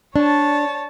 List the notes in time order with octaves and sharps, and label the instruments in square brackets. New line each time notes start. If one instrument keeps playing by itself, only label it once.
[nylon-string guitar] D4 [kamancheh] C#5 A5